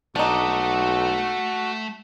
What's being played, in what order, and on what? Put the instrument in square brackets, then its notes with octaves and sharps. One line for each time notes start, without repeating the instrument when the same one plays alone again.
[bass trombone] B1 [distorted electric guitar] A3 A4 [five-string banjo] D4 D#4 [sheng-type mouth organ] F#4